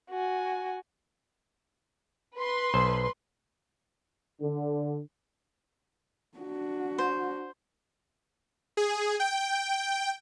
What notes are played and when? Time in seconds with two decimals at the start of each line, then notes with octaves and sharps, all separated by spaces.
0.11 F#4 G#5
2.37 B4 C6
2.74 B1 C5
4.41 D3
6.38 D4 F#4
6.98 C5
8.77 G#4
9.20 G5